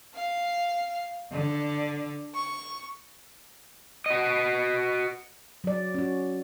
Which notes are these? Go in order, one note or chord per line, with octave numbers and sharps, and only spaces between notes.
F5
D3
C#6
F#4 D#5
F#3 D5
C#4 F#4